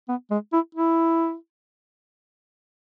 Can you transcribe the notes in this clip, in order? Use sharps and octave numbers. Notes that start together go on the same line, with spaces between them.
B3
G#3
E4
E4